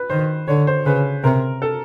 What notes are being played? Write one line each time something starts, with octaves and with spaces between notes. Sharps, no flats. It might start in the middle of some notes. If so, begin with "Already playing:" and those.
Already playing: B4
D#3 C5
D3 C#5
C5
C#3 B4
C3 A#4
A4